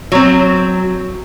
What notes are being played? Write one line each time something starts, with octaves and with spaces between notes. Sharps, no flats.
F#3 C4